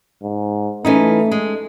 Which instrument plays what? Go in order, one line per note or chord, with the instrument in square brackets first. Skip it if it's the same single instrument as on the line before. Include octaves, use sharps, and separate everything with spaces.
[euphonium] G#2
[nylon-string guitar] E3 C#4 D#4 [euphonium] A3
[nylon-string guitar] G#3